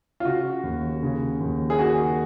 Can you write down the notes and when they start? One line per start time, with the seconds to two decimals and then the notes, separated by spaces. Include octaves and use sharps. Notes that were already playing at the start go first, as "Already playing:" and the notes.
0.20 F4
0.25 C#3 F#4
0.63 D#2
1.02 C#3
1.40 D#2
1.70 G#4
1.79 D#3 F#4